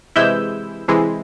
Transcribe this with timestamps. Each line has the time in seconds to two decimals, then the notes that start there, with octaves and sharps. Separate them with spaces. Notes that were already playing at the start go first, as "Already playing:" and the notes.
0.16 C3 E3 G#3 E4 E6 G6
0.88 C3 E3 G#3 E4